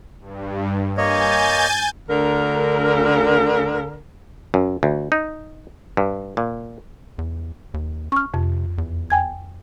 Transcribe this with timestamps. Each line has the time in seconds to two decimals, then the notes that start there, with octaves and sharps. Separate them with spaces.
0.21 G2
0.97 A#3 C#5 D#5 G#5 G6 A6
2.09 D2 D3 A#4
4.54 F#2
4.83 D2
5.12 D#4
5.97 G2
6.37 A#2
7.18 E2
7.74 D#2
8.12 C#4 C#6 F6
8.34 F2 C3
8.78 E2
9.10 G5 G#5 G#6